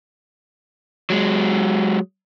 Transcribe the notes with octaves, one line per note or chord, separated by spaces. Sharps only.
F#3 G#3